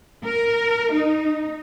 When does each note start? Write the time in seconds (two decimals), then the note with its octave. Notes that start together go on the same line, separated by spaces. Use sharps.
0.23 A#4
0.92 D#4